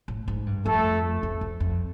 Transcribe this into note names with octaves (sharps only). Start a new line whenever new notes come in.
A2
G#2
G2
F2 A3 A4
F2
F2
F2